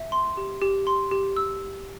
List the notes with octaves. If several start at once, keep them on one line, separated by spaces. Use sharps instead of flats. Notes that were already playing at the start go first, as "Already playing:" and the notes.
Already playing: E5
C6
G4
G4
C6
G4
E6